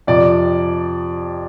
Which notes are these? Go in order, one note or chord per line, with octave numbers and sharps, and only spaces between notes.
F2 C3 F3 D5